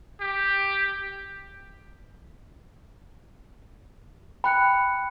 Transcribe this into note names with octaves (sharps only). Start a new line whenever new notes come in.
G4
G5 B5 F#6 C#7